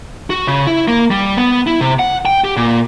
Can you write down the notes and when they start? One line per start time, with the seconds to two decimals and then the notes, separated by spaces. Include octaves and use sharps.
0.30 F#4
0.47 C#3
0.67 E4
0.88 A#3
1.11 G3
1.37 B3
1.67 E4
1.81 C3
1.99 F#5
2.25 G5
2.44 G4
2.57 A#2